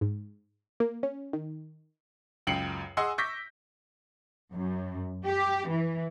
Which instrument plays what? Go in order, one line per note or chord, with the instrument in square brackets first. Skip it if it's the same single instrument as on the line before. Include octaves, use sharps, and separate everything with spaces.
[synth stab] G#2
A#3
C#4
D#3
[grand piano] C#2 F#2 G5 C7 C#7 F#7
G#4 D#5 F#5 G#5 C6 E6
C#6 D6 E6 G6 A#6 B6
[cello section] F#2
G4
E3